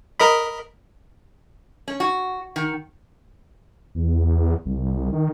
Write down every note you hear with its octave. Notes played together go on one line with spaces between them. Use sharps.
A#4 D#5 B5
C#4
F#4
D#3
E2
C2
D#3